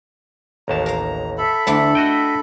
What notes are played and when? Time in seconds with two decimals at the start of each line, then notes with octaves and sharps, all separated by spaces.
0.68 A1 D#2 A5 A#5
0.86 A#4 F5
1.38 A4 E5 B5
1.67 D2 A3 D4 E4
1.95 F#4 D#5 G5